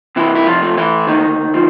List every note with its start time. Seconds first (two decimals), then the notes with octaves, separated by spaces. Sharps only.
0.16 C3 E3 E4
0.35 E4
0.46 F3 F4
0.62 A3
0.77 E3 E4
1.07 D2 D#3 D#4
1.54 F3